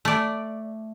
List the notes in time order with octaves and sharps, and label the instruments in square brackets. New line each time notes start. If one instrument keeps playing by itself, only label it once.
[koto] A3 D5